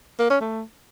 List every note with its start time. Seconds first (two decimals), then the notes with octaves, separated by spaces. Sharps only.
0.19 A#3
0.30 C#4
0.40 A3